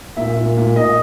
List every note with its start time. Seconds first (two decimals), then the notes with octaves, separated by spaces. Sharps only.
0.17 A#2 E5
0.36 A#2
0.57 A#2
0.76 A#2 D#5